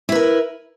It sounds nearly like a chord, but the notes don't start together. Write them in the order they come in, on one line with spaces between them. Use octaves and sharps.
E4 B4 A#4